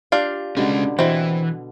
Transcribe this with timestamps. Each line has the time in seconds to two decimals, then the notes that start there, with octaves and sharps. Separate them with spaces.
0.12 D4 F4 G4 F5
0.57 B2 D3 G3 G#3 C#4
0.99 B2 E3 C4 E4